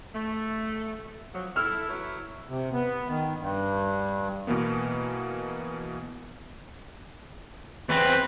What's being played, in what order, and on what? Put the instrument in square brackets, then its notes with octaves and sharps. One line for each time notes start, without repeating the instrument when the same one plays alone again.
[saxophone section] A3
F3 F#3
[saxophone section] E4 A4 [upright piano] E6 F6
[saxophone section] F#3 B3 E4
[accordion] C3
B3
D#3
G2
[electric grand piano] B2 E3 A#3 B3
[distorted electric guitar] E2 C4 [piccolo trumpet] B4